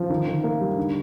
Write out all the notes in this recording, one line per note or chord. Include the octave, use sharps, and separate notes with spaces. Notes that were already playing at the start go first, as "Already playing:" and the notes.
Already playing: F3
D#3
D#3
A#3
G3
D3